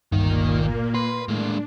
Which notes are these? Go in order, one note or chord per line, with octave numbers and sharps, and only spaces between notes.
G1 C#2 A#2 D#3 A#3 D#4
B4 C6
A2 G#3 A#3 D4